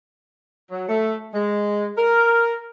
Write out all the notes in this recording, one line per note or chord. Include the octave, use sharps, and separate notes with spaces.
F#3
A3
G#3
A#4